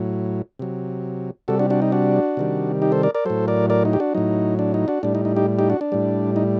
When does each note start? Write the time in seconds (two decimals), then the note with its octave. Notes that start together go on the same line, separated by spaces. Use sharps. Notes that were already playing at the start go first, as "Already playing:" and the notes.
Already playing: A2 F#3
0.59 C3 F#3
1.48 C3 G3 F#4 A4
1.59 D4 F#4
1.70 D4 F#4
1.82 D#4
1.92 D4 F#4
2.37 C3 D#3 G3
2.82 D#4 G4
2.92 A4 C5
3.03 A#4 D5
3.15 A#4 D5
3.25 A2 F#3 A4 C5
3.48 A#4 D5
3.70 A#4 D5
3.85 D#4
3.93 G4
4.00 D4 F#4
4.15 A2 F#3 D#4
4.59 D4
4.74 D#4
4.88 D4 F#4
5.03 A2 G3 D4
5.15 D#4
5.25 D#4
5.36 D#4 G4
5.59 D#4 G4
5.70 D4 F#4
5.81 D4
5.92 A2 G3
6.36 D#4